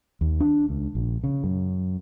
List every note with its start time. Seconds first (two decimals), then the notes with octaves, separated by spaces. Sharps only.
0.21 D#2
0.40 D4
0.69 C#2
0.95 A#1
1.24 C#3
1.44 F#2